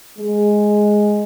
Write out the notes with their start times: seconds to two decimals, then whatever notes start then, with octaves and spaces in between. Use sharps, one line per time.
0.19 G#3